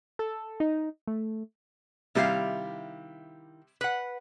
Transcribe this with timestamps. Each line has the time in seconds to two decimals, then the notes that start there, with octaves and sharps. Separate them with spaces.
0.19 A4
0.60 D#4
1.07 A3
2.15 C3 D#3 G3 E4 F5
3.81 B4 F#5